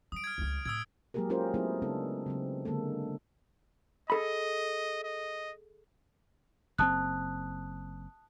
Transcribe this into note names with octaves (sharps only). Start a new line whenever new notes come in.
G3 D#6 D7
F6 G#6
C#2 G3
A2 D#6 E6 G#6
F#3 G#3 A#3 G4 G#4 A#4
C#4 F4 G4 G#4 A#4 C5
F#3 A3 B3 C4 E4 G#4
C#3 G#3 B3 D4 A4
C#3 F#3 C4
D3 G#3 A#3 A4
G#4 A4 D#5 B5
D#5
F#1 C3 C4 A5 D#6 F#6